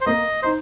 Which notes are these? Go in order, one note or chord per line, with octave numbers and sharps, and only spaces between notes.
C5
A#3 D#5
D#4 C5